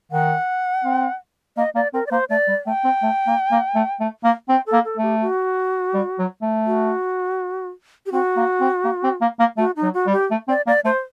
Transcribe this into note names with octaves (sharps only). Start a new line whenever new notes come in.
D#3 F#5
C4
A#3 D#5
A#3 D5
C4 A#4
D5
A#3 C5
A3 D5
G3
A3 G5
C4
A3
A#3
A#3
A3
A3
A#3
C4 G5
A4
A#3
A4
A3
G4
F#4
G3
F#3
A3
F#4
G4
C4 F#4
A#3
C4
A#3
C4
A#3
A#3
A3 F#4
D#4
F#3
F#4
G3
G4
A3
C4 D5
A#3 D5
A3 C5